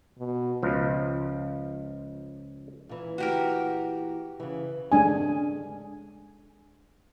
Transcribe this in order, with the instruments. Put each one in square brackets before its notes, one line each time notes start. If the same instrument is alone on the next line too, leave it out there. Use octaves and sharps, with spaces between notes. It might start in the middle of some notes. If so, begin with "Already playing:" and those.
[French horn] B2
[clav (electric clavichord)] C#2 F3
[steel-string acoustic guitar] A#2 E3
[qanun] F#4 G4 A#4
[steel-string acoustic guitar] C#3 E3
[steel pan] G#3 D4 G#5